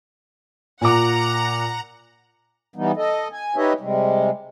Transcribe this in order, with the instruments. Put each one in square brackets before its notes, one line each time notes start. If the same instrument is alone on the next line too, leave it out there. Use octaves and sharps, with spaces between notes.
[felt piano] A#2 D6 [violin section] F#5 A#5
[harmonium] E3 G3 B3 D#4
A4 D#5
G#5
D#4 G4 B4 C#5 D#5 E5
C3 G3 G#3